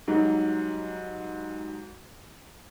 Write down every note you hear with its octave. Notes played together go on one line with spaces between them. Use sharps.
G#2 F#3 G3 D#4